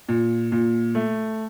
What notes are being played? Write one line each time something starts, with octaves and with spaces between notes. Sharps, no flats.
A#2
A#2
A3